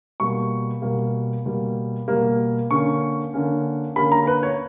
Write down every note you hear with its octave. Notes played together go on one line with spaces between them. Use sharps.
B2 G3 A#3 C#6
B2 G3 A#3
B2 G3 A#3
B2 G3 A#3
D3 A#3 C#4 C#6
D3 A#3 C#4
D3 A#3 C#4 B5
A#5
B4
C#5